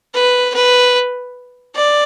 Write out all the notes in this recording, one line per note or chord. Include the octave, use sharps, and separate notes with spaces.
B4
B4
D5